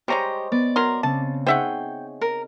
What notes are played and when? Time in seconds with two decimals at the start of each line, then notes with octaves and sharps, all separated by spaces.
0.08 G3 G#3 G4 C5 C#5 D#5 A#5
0.52 B3 D5
0.76 F#3 A#4 C6
1.03 C#3 C4 A5
1.46 D#4 G#4 C5 C#5 E5 F#5 G5
2.21 A#4